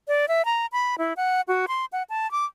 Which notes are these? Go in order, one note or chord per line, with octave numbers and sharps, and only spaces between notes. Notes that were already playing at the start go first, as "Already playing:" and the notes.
D5
E5
A#5
B5
E4
F#5
F#4
C6
F#5
A5
D6